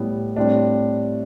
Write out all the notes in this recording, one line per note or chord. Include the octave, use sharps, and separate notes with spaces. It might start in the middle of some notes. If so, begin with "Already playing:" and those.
Already playing: A2 G3 B3
A2 G3 C4 D4